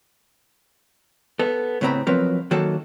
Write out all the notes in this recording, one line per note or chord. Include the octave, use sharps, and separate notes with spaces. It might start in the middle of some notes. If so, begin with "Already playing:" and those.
B3 A4
A2 C#3 B3 C4 A#5 B5
F3 F#3 B3 C4 A#4 B4
D#3 F#3 A#3 F#4 A4